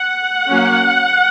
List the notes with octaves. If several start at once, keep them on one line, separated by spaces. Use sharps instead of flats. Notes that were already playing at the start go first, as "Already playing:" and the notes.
Already playing: F#5
F#3 A#3 C#4